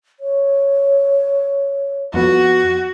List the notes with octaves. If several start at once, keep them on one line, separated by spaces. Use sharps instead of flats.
C#5
F2 B3 F#4